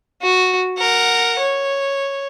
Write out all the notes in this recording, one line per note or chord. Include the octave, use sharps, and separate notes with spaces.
F#4
A#4 F#5
C#5